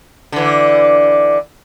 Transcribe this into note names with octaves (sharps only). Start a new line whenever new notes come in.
D3 E3